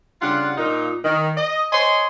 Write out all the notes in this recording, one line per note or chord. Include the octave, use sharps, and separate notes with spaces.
C#3 G3 D4 F4 F#5
A#2 D#4
D#3
D#5
C5 C#5 D#5 G#5 C6